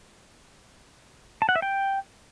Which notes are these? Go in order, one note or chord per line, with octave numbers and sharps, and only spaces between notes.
A5
F#5
E5
G5